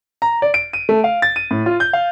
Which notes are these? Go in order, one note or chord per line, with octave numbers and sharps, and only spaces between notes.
A#5
D5
D7
D#7
A3
F5
A6
D#7
A2
F4
G6
F5